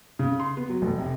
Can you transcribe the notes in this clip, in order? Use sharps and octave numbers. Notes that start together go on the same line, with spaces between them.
C#3
C6
B3
F#3
F1
C3